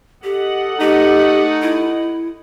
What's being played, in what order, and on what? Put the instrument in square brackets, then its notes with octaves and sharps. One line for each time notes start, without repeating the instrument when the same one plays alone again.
[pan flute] G4 [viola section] A4 D#5 F#5
[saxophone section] A3 D#4 [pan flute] G4
[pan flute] E4